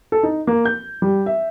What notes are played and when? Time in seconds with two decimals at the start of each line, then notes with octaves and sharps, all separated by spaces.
0.12 A4
0.23 D#4
0.47 A#3
0.65 G6
1.02 G3
1.26 E5